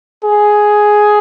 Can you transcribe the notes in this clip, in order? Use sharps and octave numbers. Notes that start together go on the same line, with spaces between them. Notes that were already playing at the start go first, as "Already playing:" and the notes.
G#4